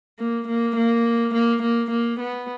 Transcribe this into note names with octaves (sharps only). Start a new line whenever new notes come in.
A#3
A#3
A#3
A#3
A#3
A#3
B3